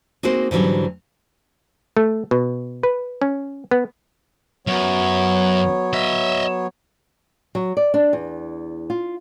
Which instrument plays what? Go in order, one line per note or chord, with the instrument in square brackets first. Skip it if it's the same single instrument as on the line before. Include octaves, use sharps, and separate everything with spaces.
[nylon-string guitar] G#3 A#3 C4 D#4 F#4 C5
G#2 D3 E3 F#3 G3 C#4
[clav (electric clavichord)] A3
B2
B4
C#4
B3
[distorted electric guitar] F#2 [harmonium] F#3 B3 C#5
[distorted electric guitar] D#5 E5
[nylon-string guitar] F#3
D5
D4
E2
F4